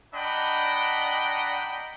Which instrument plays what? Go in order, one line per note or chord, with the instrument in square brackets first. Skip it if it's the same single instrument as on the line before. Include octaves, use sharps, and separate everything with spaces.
[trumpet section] D4 D#5 F#5 G5 A#5 B5